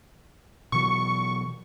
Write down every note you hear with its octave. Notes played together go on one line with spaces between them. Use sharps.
B2 E3 F#3 C#6